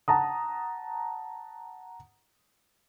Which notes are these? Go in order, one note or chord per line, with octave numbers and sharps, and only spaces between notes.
F#5 A5 A#5 D#6